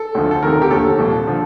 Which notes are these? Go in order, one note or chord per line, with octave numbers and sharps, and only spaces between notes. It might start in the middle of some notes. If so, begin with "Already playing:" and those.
Already playing: A4
D2 D3 F3
A4
D2 C3 D#3 A#4
G4
D#2 D3 F3 A4
C2 A#2 F3
D3 F3